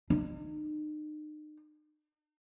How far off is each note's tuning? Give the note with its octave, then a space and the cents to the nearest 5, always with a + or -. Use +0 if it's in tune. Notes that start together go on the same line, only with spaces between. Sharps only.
D#4 -40